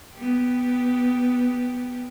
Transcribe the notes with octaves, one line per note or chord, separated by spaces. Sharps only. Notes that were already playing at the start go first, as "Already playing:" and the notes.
B3 G4